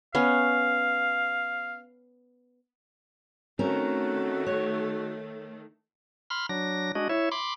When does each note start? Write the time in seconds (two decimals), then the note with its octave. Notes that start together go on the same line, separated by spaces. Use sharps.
0.15 B3 C#4 F5
3.59 D#3 A3 C4 C#4 F#4 A#4
4.46 C#5
6.30 B5 C6 F6
6.49 F#3 D4 A#6
6.95 G#3 D4 F#4 D#5
7.09 E4 C#5 E5
7.32 B5 C6 D6